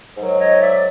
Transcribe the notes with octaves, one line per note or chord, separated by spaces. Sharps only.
G#2 D#3 F#3
C#5 D#5
D5 E5